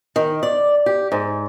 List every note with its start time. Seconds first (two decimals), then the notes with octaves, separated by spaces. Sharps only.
0.16 D#3
0.43 D5
0.86 G4
1.12 G#2